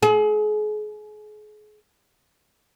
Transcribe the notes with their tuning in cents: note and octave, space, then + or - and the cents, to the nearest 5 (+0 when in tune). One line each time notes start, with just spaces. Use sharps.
G#4 +35